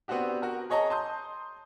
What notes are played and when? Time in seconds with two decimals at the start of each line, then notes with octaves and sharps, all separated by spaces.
0.08 B3 C4 D4 F#4 G4
0.42 F#4 A#4
0.70 G#4 C#5 D#5 A5 A#5
0.90 A5 C6 D#6 G6